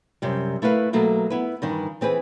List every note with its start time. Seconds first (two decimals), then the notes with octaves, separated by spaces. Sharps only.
0.22 F#2 C3 G3
0.62 A3 E4 A#4 B4 F5
0.93 B2 F#3 A3 A#3
1.30 B3 E4 B4
1.62 G2 D#3 E3
2.01 E3 C4 G#4 B4